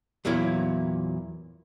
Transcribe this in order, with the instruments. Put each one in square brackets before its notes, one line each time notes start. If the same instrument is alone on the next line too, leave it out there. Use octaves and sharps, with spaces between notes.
[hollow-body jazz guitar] E2 A#2 F#3 A#3 E4